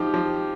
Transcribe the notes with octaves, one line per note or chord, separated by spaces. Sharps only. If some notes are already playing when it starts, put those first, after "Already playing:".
Already playing: F3 D#4 G4
F3